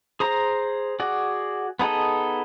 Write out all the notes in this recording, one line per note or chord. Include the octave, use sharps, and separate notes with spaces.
G#4 C5 A#5
F#4 G#4 D5
B3 D#4 G#4 A4 D#5